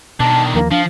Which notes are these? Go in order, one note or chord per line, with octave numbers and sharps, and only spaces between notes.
B2 D3 D#3 A5
D#2 F3 A#3
F3 D4 F5